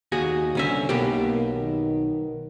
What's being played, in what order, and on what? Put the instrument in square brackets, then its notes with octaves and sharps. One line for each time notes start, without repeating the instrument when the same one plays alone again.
[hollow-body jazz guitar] D#2 F#4 G#4
[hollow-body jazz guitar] C2 C#4 E5 [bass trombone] D3
[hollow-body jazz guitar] B1 B2 G4 [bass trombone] A#3
[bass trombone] D#3